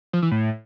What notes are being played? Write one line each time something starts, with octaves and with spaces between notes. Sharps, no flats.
F3
E3
A2